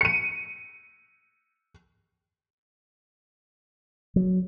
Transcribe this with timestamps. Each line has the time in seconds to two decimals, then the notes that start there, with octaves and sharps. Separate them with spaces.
0.01 C#7 D#7
4.16 F#3